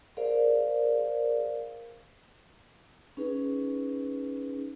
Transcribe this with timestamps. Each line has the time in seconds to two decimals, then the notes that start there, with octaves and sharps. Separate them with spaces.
0.17 G#4 A#4 C5 D5 F5
3.17 C#4 D#4 G#4 B4